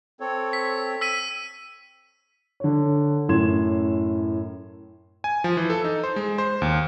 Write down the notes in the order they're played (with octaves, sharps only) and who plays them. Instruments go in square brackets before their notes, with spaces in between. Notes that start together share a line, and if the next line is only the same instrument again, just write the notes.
[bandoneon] C4 A4 C#5
[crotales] B6
E6 B6 D#7
[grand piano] D3 C#5
F#2 A2 C#4 C6 G#6 E7
[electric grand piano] G#5
F3
E3
A4
D#4
C5
G#3
C5
D#2